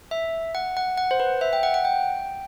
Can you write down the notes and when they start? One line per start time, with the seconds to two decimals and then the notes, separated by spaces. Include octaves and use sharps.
0.11 E5
0.55 F#5
0.77 F#5
0.98 F#5
1.11 C5
1.20 B4
1.41 E5
1.53 G5
1.63 F#5
1.74 F#5
1.85 G5